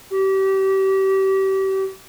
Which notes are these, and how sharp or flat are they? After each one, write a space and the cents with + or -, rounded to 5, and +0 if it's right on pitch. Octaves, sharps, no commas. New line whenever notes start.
G4 -30